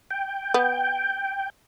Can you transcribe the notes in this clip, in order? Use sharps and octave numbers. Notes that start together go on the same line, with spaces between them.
G5
B3